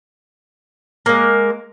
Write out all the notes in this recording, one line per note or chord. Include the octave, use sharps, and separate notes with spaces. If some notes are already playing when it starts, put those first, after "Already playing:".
G#3 A#3